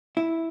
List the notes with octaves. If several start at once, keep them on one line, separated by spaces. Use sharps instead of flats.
E4